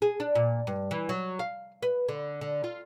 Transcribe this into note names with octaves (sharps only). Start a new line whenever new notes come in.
G#4
D4
A#2
G2
E3
F#3
F5
B4
D3
D3
F4